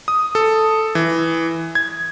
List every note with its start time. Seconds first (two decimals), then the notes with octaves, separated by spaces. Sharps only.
0.08 D#6
0.35 A4
0.95 E3
1.75 G#6